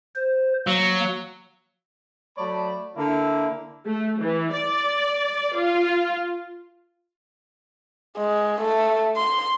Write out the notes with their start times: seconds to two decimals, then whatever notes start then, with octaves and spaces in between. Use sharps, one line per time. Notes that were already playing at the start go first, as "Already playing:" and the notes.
0.15 C5
0.67 F#3 A#3
2.38 F#3 A3 C#5 D5 A5 B5
2.97 D3 A#3 E4
3.85 A3
4.19 E3
4.51 D5
5.56 F4
8.17 G#3
8.61 A3
9.16 C6